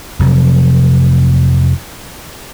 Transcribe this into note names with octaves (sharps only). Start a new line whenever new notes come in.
F1 F2 C3 F#3